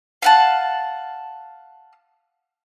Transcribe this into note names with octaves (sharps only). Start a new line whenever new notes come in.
F5 F#5 A5